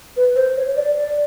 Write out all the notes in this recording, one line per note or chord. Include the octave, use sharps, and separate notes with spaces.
B4
C5
C#5
D5
D5